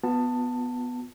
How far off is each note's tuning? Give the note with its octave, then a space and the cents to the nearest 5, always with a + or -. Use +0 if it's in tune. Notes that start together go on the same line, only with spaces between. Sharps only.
B3 +0 F4 +40 A5 +15